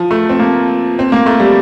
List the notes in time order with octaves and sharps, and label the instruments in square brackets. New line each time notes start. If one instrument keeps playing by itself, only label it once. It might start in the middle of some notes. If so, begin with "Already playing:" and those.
Already playing: [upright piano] F3
A3
C4
A#3
C4
A#3
A3
G3